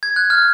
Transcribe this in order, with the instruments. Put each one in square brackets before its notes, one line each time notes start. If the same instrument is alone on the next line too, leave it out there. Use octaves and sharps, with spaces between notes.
[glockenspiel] G#6
F#6
F6